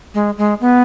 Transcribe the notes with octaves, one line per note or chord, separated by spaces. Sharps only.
G#3
G#3
B3